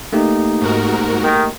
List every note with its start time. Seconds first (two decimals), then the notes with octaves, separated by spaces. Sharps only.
0.13 A3 A#3 D#4 G4
0.61 G#2 F#4 A#4
1.23 D#3